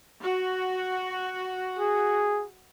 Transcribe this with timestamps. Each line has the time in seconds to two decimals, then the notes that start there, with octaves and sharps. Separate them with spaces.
0.19 F#4
1.79 G#4